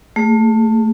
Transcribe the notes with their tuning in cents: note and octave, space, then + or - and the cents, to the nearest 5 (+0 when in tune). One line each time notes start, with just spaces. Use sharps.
A3 +20 G#4 -10